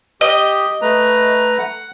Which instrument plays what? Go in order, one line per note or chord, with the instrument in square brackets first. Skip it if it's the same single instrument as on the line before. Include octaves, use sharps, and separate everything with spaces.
[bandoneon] G4 [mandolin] D#5
[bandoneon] A3 B4 A#5
F#5